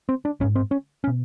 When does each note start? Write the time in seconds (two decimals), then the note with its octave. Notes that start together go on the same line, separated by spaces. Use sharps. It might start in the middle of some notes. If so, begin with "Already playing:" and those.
0.09 C4
0.25 D4
0.40 G#1 C#4
0.44 G#2
0.55 C4
0.71 C#4
1.04 C#4
1.07 B2